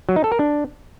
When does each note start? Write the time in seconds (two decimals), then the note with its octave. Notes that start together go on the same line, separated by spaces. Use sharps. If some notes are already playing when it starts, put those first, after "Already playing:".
0.09 F#3
0.16 D#4
0.24 A4
0.32 A#4
0.39 D4